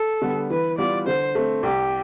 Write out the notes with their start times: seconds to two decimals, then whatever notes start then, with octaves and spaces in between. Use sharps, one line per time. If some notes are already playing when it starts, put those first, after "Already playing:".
Already playing: A4
0.22 D3 G3 B3
0.50 E3 B4
0.78 G3 B3 F4 D5
1.07 D3 C5
1.35 A3 C4
1.63 C2 G4